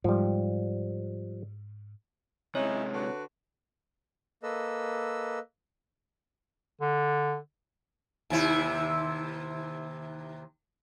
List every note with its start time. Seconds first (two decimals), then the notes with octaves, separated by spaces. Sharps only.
0.04 G#2 F3 G3
2.55 C3 G#3 C#4 D#4 E4 C#5
2.94 D3 F#4 B4
4.43 A#3 A4 B4 D#5 E6
6.81 D3
8.30 D#2 C3 E4